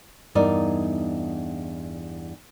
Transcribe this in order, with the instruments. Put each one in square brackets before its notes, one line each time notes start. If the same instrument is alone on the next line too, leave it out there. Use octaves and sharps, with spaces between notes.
[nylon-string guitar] E2 G2 D#4 A#4 D5